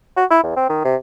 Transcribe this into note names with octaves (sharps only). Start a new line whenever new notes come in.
F#4
E4
E2
C4
D#3
C3